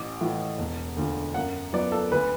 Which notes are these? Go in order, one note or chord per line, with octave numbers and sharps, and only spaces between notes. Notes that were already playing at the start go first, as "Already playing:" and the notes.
Already playing: A1 D6
A2 E3
E1
D2 D3
F#2 F#5
F#3 B3 D5
A4
D2 B4